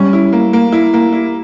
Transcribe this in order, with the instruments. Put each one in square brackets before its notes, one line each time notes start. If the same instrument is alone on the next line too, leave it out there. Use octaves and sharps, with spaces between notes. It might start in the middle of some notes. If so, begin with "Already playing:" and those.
Already playing: [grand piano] G3 [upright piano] C#4
[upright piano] E4
A#3
A#3
E4
A#3
E4